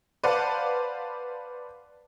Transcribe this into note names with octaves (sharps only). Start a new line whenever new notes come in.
B4 C5 D5 F5 F#5 A5